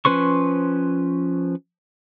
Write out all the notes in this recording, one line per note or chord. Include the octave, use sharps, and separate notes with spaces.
F3 C#4 B4 C5 C#6